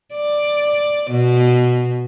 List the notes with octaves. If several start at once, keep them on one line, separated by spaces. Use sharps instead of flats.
D5
B2